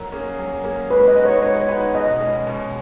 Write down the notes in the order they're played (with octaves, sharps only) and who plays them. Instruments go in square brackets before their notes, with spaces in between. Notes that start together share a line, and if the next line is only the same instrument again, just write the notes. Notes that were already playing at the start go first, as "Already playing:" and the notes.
Already playing: [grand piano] F#3 [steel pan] A#4
[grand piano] A#3 C#4 G#4
F#3
A#3 C#4 G#4
[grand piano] G#3 [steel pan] B4
[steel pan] D#5
[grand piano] B3 D#4 F#4 B4
[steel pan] C#5
[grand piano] G#3 [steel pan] C#5
[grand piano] B3 D#4 F#4 B4
[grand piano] B2 [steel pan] D#5
[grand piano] G#3 C#4
B2